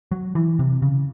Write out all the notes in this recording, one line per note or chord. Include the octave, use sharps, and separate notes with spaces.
F#3
E3
C3
C#3